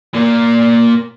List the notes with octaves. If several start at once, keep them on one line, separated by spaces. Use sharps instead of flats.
A#2 A#3